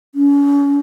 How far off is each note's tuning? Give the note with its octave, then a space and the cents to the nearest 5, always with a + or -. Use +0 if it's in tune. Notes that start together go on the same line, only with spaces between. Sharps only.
C#4 +35